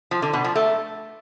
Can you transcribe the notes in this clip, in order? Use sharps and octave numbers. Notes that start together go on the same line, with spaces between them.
F3
D3
B2
F3
A3